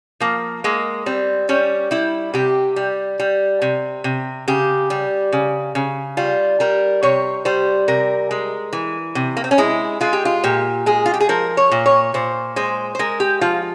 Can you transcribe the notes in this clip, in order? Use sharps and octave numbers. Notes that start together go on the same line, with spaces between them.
F3 A#3
G#3 A#3
G3 C4
G3 C#4
G3 E4
C3 G4
G3
G3
C3
C3
C#3 G4
G3
C#3
C#3
G3 F4
G3 A#4
C3 C#5
G3 C5
C3 A#4
G#3
E3
C3
A#3
C4
C#4
G#3 E4
G#3 F4
G4
F4
A#2 G4
G#3 G#4
F4
G4
G#4
F3 A#4
C#5
A#2
C#5
A#2 C5
G#3 C5
C5
G#3 A#4
G4
F3 F4